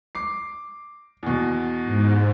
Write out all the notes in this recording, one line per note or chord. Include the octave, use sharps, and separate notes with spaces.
D6 C7
E2 B2
G#2